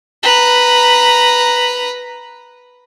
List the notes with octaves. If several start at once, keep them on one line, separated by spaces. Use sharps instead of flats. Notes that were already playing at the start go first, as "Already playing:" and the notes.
B4 A#5